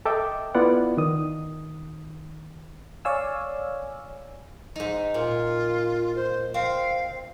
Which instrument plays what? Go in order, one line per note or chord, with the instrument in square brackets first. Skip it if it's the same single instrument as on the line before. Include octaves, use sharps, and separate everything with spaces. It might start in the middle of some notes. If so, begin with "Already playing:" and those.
[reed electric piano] A4 D#5 E5 G5 D6
B3 E4 F4 D5 F#5
D#3 D#6
[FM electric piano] C#5 D5 F5 G#5 E6
[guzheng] G#2 D#4
[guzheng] A#2 [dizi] F4
[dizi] C5
[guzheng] C4 [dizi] F5